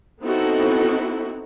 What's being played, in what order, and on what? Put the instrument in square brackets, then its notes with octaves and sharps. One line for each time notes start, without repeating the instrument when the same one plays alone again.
[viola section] B3 C4 D#4 E4 F#4 A4